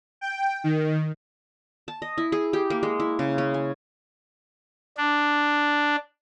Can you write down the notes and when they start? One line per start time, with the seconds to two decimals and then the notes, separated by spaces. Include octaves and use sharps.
0.21 G5
0.64 D#3
1.88 A5
2.02 D#5
2.18 E4
2.32 G#4
2.53 G4
2.70 A#3
2.83 G#3
3.00 E4
3.19 C#3
3.38 C#4
3.54 G#5
4.97 D4